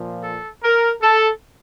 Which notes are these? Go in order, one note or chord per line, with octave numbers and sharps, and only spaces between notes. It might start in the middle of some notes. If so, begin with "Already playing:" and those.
Already playing: A#2 F3
A4
A#4
A4